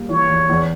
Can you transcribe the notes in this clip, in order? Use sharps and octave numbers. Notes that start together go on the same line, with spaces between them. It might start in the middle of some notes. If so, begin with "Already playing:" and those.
Already playing: G3 A#3
E3 C#5
E2
E2